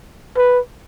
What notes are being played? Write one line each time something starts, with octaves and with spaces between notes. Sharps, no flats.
B4